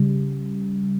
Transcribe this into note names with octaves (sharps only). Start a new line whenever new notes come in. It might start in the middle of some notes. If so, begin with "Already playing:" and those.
Already playing: C#3 G3